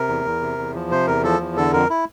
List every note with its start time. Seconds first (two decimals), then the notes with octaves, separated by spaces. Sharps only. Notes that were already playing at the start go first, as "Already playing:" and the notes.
Already playing: C3 A#4
0.09 E2
0.25 E2
0.42 C3
0.58 E2
0.75 F3
0.91 C3 C5
1.07 E2 A#4
1.24 F3 A4
1.40 E2
1.57 D3 A4
1.73 F2 A#4
1.90 E4